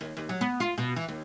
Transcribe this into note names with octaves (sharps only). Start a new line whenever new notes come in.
D#2
D#2
F#3
B3
F4
B2
E3
D#2